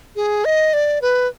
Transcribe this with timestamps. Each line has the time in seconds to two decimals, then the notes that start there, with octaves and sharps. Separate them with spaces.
0.16 G#4
0.45 D#5
0.73 D5
1.02 B4